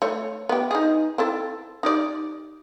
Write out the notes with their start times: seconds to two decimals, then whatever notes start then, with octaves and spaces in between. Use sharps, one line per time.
0.02 A3 C#5
0.49 B3 G4
0.71 D#4 G#4
1.18 C4 E4 A4
1.83 D#4 G4 D5